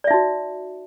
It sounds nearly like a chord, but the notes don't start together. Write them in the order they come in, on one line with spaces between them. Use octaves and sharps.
D5 E5 D#4 F#4